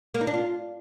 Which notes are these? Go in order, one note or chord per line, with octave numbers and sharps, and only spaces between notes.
A#3
D#4
D4
F4